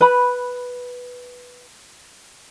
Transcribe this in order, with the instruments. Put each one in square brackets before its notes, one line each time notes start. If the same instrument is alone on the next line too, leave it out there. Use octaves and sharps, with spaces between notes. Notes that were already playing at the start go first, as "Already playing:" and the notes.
[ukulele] B4 B5